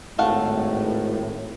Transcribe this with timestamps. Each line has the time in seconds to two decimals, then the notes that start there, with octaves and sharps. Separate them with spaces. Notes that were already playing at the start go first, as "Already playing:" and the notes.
0.18 G#1 A2 A3 F5 F#5